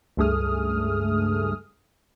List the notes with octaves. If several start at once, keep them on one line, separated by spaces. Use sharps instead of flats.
C#2 G2 A3 G#4 D#6 F6